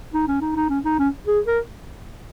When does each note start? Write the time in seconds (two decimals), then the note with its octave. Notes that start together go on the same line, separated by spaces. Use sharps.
0.14 D#4
0.28 C#4
0.41 D#4
0.56 D#4
0.69 C#4
0.85 D#4
0.99 C#4
1.27 G#4
1.46 A#4